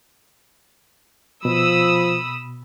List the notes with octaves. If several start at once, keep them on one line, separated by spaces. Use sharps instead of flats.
B2 F3 B5 D#6 E6